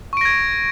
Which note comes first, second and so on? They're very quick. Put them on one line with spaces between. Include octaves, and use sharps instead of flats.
C#6 D7 A#6 G#6